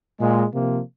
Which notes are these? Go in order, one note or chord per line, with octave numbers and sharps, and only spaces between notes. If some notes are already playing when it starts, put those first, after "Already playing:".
A#2 G#3
C3 F3 A#3